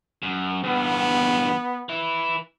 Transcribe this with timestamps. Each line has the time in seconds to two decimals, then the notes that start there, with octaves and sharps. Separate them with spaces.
0.23 F#2
0.64 E2 G2 B3
1.89 E4 B4